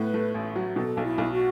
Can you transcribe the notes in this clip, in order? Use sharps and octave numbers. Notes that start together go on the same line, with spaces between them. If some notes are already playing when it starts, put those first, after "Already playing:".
Already playing: A2 B3 B4
A3
A1
F#3
B2 A4
B1
E4
B1
F#4